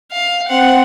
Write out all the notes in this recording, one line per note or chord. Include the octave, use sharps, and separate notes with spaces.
F5
C4 F#5